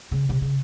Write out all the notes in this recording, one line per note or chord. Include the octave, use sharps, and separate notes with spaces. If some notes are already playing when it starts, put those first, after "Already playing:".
C#3
C3
C#3